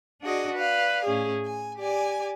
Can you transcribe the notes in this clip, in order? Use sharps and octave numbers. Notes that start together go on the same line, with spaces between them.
D4 F#4 G#4 D5 D#5
B4 D5 F5
A2 C#4 G#4
G#5
G4 D5 G#5